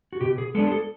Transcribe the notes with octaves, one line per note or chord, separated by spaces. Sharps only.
F#4
B2 G4
G#4
G#3 B3 D4 A4
G#4
A4